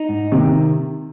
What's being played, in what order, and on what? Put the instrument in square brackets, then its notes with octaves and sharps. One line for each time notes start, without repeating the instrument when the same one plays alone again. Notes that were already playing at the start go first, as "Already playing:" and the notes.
Already playing: [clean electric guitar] D#4
G#2
[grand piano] C3 [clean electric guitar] D#3